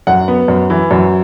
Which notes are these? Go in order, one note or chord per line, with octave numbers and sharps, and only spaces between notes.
F#2 F#5
B3
F#2
E3
F#2